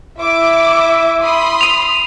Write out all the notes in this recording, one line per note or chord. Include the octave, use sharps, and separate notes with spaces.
E4 E5 D6
B5 C6 D#6
D#7 F7